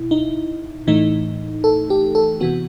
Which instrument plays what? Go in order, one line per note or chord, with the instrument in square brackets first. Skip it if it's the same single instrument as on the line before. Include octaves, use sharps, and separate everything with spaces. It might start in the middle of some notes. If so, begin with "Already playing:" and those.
Already playing: [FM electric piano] B2 E4
D#4
A2 E3 A3 D#4
A4
G4
A4
C3 E3 B3 F#4